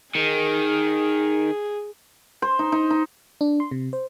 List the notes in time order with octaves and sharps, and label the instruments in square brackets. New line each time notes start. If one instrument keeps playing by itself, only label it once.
[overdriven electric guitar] D#3 [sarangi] G#4
[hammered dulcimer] C5
D#4
D#4
D#4
[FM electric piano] D4
C6
C3
C5